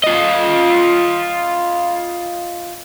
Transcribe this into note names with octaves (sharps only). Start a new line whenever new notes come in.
F4 D#5